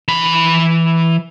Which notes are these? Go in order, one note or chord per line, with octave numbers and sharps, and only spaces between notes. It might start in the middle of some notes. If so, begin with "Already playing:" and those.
E3 B5